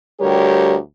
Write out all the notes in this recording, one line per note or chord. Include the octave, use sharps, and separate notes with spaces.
D2 G3 G4 A#4 C#5